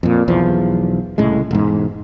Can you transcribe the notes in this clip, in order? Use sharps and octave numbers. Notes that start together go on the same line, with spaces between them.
F2 A#2
B1 E2 F3
C2 A2 C#3 G#3
E1 G#2